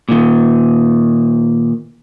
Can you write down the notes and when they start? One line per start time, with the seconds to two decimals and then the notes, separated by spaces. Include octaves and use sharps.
0.09 A#2 D#3